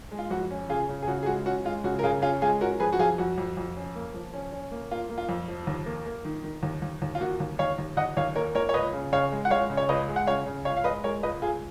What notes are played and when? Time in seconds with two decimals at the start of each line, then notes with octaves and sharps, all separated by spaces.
0.11 G#3
0.19 F4
0.30 F2 F#4
0.51 C#4
0.69 C#3 F4 G#4
0.89 C#3
1.02 G#4
1.08 C#3 F#4
1.23 G#4
1.26 G#3 F#4
1.45 C#4 F#4
1.65 G#3 F4
1.84 C#3 F#4
1.99 A#4
2.03 C#3 F4 G#4
2.22 C#4 F4 G#4
2.42 G#3 F4 G#4
2.61 C#4 F#4 A#4
2.80 F3 G#4 B4
2.93 F#4
2.99 F2 F4 G#4
3.18 F2 F#4
3.38 F2
3.57 F2
3.76 C#4
3.96 A#3
4.14 F3
4.34 C#4
4.52 C#4
4.72 A#3
4.91 A#3 F4
5.10 A#3
5.18 F4
5.29 F2
5.48 F3
5.67 D#2
5.86 A#3
6.06 A#3
6.25 D#3
6.44 D#3
6.63 D#2
6.82 D#2
7.02 D#2
7.15 F4
7.20 A#3 F#4
7.40 D#2
7.59 D#2 C#5 F5
7.78 D#2
7.97 D#2 D#5 F#5
8.17 D#2 C#5 F5
8.36 A#3 A#4 C#5
8.54 A#3 A#4 C#5
8.69 C#5
8.74 C#2 B4 D#5
8.93 C#3
9.12 C#3 C#5 F5
9.32 G#3
9.45 F#5
9.50 G#3 C#5 F5
9.70 C#3
9.77 C#5
9.89 C#2 B4 D#5
10.08 G#3
10.16 F#5
10.27 C#3 C#5 F5
10.46 C#3
10.65 C#2 C#5 F5
10.77 F5
10.84 G#3 B4 D#5
11.04 G#3 A#4 C#5
11.23 C#2 B4 D#5
11.42 C#2 F4 G#4